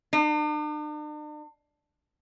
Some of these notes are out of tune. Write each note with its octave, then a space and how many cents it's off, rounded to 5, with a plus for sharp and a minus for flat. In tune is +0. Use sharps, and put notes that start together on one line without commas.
D4 +45